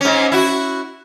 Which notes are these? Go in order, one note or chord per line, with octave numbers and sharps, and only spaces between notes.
G#2 C#4
E4 F#4